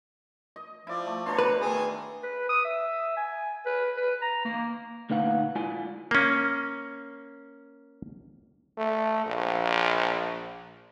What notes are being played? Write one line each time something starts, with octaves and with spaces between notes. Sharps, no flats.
D#5
F3 E4 D5
A3
B2 D4 C#5 A#5 C6
B4
D#3 G#3 A3 G#4
B4
D#6
E5
G#5
B4
B4
A#5
A#3
D2 A#2 D#4 B4 F5 F#5
G#3 E4 F4 D5 G#5
A#3 C#4
A3
A#1